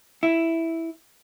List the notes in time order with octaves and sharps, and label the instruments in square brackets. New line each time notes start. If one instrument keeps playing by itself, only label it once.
[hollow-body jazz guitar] E4